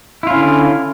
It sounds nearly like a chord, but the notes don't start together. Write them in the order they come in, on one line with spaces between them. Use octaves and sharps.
E4 F4 C#4 D3